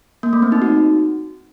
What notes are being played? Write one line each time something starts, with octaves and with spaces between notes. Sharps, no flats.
A#3
A3
C4
D#4
F#4